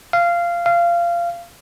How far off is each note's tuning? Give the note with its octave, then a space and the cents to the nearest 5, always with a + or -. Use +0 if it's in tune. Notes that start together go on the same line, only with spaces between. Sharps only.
F5 -15
F5 -20